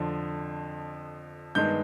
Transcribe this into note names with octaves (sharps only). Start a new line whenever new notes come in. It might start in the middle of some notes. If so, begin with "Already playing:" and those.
Already playing: F2 D3 F3
G2 D#3 G#3 B3 G6